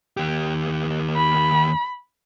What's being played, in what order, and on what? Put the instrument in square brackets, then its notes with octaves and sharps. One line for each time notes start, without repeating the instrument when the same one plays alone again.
[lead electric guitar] D#2 G4
[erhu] B5